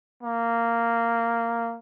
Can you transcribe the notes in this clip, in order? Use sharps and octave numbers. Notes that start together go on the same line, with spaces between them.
A#3